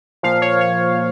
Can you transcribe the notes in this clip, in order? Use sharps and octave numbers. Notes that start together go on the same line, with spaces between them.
A#2 F3 F5
C#5
C#5